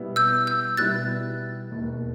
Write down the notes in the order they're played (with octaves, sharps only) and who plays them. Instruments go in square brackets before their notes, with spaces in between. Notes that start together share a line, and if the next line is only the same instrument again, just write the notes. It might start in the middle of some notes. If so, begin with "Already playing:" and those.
Already playing: [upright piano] B2 G3 B3 E4
[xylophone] E6 G6
E6 G6
[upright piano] B2 G3 B3 E4 [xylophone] F#6 A6
[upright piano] E1 D#2 D#3